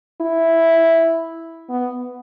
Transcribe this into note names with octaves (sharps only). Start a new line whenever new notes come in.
E4
B3